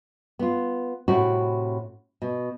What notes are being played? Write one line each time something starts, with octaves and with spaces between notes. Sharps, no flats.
B3 F4
A2 C3 E4 F#4
B2